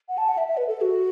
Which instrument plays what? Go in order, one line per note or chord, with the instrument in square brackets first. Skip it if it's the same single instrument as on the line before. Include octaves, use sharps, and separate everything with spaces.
[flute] F#5
A5
F#5
E5
E5
B4
A4
F#4